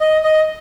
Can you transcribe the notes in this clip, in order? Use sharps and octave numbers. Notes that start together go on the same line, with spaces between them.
D#5
D#5